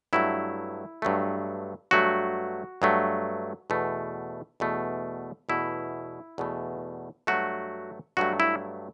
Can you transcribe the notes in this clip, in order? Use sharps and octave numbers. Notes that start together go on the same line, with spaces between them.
G2 F#3 A3 E4
G2 F#3 A3
G2 F#3 A3 F#4
G2 F#3 A3
E2 B2 A3
E2 B2 A3
E2 B2 A3 E4
E2 B2 A3
G2 F#3 A3 F#4
G2 F#3 A3 F#4
E4